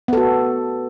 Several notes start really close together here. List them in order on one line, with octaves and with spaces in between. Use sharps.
B3 A4 F#4